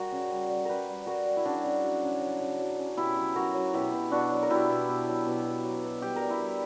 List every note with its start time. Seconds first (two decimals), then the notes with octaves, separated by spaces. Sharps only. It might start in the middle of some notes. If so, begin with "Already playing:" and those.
Already playing: G3 F#4 A#4
0.12 C#3
0.31 G3
0.49 G3
0.65 G3 G4 A#4 B4
0.88 G3
1.06 G3 F#4 A#4
1.26 G3
1.37 E4
1.45 C#3 D4 F#4
1.64 C#3
1.83 F#3
2.03 C#3
2.21 F#3
2.40 C#3
2.59 F#3
2.78 C#3
2.97 B2 E4 G4
3.17 F#3
3.36 F#3 F#4 A#4
3.54 F#3
3.74 B2 E4 G4
3.93 B2
4.11 B2 D4 F#4
4.31 F#3
4.43 A#4
4.50 B2 E4 G4
4.69 B2
4.89 B2
5.08 F#3
5.26 B2
5.46 B2
5.64 F#3
5.84 B2
6.02 G3 G4
6.16 G3 A#4
6.29 E4 G4
6.40 G3